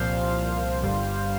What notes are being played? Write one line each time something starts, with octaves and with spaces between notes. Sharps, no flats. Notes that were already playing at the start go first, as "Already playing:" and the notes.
Already playing: C2 A#2 F3 C5 F5
G1 G2 G3